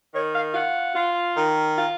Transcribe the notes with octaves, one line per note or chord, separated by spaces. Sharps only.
D#3 C#5
F5
F4 F#5
F4
D#3
F4